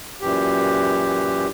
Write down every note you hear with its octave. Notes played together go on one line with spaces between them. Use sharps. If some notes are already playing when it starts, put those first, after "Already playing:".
F#2 A#2 E3 G4